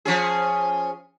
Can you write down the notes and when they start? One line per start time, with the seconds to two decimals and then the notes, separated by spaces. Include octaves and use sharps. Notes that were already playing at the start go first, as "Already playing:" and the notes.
0.05 F3 C#4 G#4